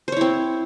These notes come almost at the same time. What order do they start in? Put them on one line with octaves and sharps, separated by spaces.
C5 C#5 E4 C4